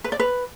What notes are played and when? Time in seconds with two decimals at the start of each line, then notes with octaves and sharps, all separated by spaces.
0.04 B4
0.12 D5
0.20 B4